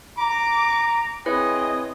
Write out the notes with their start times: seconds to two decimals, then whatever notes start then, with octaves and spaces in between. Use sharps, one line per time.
0.18 A#5 D6
1.26 C4 E4 G#4 B4 C#5 D#5